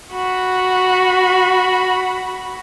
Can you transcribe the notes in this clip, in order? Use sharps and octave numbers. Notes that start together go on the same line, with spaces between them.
F#4 B5